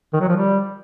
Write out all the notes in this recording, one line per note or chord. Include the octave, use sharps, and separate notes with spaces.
D#3
F#3
F3
G3